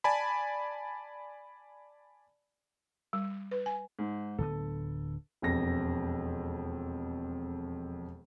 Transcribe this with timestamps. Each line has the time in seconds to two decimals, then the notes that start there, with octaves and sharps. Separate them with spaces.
0.04 D5 G#5 A5 B5
3.13 G3
3.51 B4
3.66 G#5
3.99 G#2
4.38 D1 D3 B3 A4
5.42 E1 F2 A#6